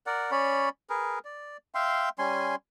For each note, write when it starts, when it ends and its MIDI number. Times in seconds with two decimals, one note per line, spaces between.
0.06 0.31 70
0.06 0.31 74
0.06 0.31 78
0.31 0.69 61
0.31 0.69 73
0.31 0.69 74
0.31 0.69 83
0.90 1.19 68
0.90 1.19 70
0.90 1.19 71
1.25 1.57 74
1.75 2.09 76
1.75 2.09 77
1.75 2.09 79
1.75 2.09 84
2.19 2.55 55
2.19 2.55 61
2.19 2.55 80
2.19 2.55 84